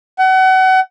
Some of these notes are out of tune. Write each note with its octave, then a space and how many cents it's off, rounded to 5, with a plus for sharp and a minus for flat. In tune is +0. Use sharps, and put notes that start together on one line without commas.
F#5 +30